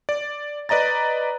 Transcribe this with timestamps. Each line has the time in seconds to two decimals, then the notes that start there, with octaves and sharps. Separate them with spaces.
0.09 D5
0.69 B4 D5 D#5 A#5 A6